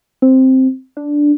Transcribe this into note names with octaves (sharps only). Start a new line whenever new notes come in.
C4
D4